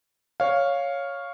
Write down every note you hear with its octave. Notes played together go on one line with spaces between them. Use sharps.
C#5 F5